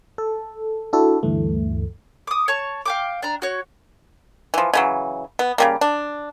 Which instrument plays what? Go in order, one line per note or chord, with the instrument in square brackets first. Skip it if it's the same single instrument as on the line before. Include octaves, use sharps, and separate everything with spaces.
[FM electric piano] A4
D4 E4 F#4 A4
D2 G2 E3 A3
[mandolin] D6 D#6
C#5 A5 C#6
F5 G5 D6
D4 A#5
F#4 C#5
[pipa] E3 F3
C#3 E3 F#3
B3
C#3 G3 A#3
D4